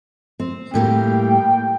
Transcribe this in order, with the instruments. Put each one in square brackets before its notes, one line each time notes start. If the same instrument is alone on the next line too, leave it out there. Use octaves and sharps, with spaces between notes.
[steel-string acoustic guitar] C4
[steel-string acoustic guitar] A2 G3 A#3 [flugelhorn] G5